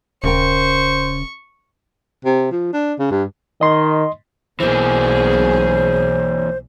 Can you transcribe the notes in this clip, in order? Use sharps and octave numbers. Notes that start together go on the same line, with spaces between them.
D#1 C#3 A#4 C5 G5 C#6
C3
F3
D4
C#3
G2
D#3 D#5 C6
B1 E3 A#3 G#4 C5